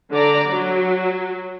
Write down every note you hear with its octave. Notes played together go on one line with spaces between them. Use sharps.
D3 D5 A#5
F#3